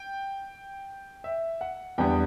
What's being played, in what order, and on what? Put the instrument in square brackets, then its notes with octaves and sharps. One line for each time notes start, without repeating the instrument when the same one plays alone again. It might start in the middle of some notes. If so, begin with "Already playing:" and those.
Already playing: [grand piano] G5
E5
F#5
E2 D3 G3 B3 G5